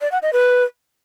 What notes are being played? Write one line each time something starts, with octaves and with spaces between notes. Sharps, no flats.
D5
F#5
D#5
B4